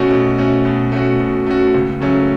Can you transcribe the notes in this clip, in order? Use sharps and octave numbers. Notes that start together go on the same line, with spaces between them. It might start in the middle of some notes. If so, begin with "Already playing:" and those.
Already playing: B2 A3 C#4 F#4
B2
A3 C#4 F#4
B2
A3 C#4 F#4
B2
A3 C#4 F#4
C#2
C#3 F#3 A3 C#4